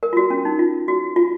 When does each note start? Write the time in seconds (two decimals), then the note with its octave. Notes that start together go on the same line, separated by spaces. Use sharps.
0.03 A#4
0.13 F4
0.17 F#4
0.30 C#4
0.45 D#4
0.59 F4
0.88 F#4
1.16 F4